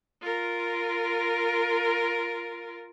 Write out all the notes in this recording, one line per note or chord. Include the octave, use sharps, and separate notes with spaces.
F4 A#4